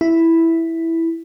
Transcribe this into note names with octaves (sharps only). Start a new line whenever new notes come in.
E4